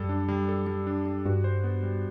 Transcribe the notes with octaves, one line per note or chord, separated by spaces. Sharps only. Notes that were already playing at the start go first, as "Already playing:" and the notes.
Already playing: F#2 G3 A4
D4
G3
A4
G3
D4
G3
G2 F#4
C5
B3
G3